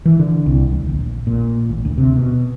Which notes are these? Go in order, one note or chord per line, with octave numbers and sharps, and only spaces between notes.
E3
D3
C2
D2
A#1
A#2
A1
D2
C3
B2